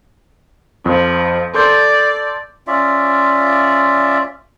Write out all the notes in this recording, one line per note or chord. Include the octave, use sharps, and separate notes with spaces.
F2 F3
A4 D5 C6 G6
C#4 F4 D5 E5